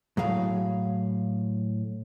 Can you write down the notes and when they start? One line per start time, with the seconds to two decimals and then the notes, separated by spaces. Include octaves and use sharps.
0.17 A2 F#3 G#4 F5